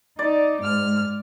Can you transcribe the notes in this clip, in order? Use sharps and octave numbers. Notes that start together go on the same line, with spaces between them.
D#4 D5
G#2 F6